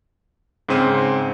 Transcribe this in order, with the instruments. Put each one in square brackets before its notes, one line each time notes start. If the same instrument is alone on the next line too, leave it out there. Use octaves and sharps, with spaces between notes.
[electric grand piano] G#2 C#3 C4 D#7